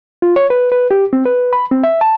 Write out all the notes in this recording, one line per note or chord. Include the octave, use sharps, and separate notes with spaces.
F4
C#5
B4
B4
G4
C4
B4
B5
C4
E5
A5